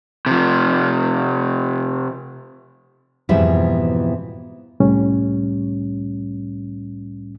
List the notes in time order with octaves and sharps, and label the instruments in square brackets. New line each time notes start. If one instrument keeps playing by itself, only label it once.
[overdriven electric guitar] C3 F3
[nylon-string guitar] F2 G#2 B2 E3 G3 E4
[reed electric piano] C2 A2 G3 C#4